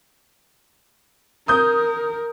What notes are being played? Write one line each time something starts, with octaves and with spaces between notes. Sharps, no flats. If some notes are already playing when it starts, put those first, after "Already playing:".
A#4 D#6 G6